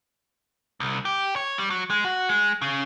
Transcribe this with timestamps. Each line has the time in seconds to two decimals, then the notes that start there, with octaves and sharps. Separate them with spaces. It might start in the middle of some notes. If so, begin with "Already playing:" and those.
0.80 C2
1.05 G4
1.36 C#5
1.58 G3
1.70 F#3
1.90 G#3
2.04 F#4
2.29 G#3
2.62 C#3